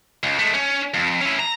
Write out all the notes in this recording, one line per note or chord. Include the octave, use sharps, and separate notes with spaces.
C#2
G#3 A3
C#4
F2
C#4 E4
A#5